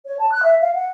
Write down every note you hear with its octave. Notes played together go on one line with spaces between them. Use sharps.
C#5
A5
F#6
E5
F5
F#5